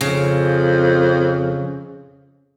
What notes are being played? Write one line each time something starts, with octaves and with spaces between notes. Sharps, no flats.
F2 C#3